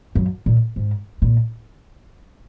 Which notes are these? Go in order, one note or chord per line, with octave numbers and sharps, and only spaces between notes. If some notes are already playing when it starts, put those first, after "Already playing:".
F#2
A#2
G#2
A#2